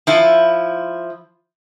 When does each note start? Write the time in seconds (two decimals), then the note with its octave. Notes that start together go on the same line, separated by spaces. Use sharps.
0.07 F3 E4